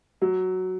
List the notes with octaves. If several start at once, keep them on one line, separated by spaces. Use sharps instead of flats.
F#3